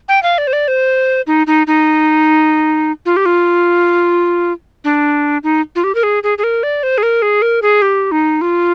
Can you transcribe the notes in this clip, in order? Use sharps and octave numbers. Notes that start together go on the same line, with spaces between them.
G5
F5
D5
C5
D5
C5
D#4
D#4
D#4
F4
G4
F4
D4
D#4
F4
G4
A#4
G#4
G#4
G#4
A#4
D5
C5
G#4
A#4
G#4
A#4
G#4
G4
D#4
F4